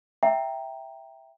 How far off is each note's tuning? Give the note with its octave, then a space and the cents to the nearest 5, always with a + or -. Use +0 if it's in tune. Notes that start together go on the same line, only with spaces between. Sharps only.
E5 +0 G5 +0 A#5 +0